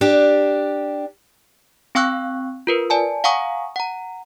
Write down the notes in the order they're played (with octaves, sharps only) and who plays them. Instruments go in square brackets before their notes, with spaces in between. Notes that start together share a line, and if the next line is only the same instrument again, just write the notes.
[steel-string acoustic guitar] D4 G4
[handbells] C4 F5 G5 C#6 E6 F#6
F4 A#4 B4
D5 G#5 A5
F5 F#5 G#5 A#5 C#6 D#6
F#5 A#5